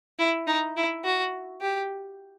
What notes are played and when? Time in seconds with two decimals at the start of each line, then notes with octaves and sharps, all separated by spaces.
0.19 E4
0.47 D#4
0.76 E4
1.04 F#4
1.61 G4